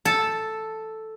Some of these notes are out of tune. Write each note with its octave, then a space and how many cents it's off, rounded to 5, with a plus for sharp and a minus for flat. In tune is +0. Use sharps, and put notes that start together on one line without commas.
A4 +0 A5 +0